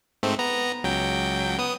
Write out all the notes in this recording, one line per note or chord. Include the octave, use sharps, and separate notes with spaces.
G#2 A3 C4
B3 A#5
C#2 F#3 G5
B3 D#6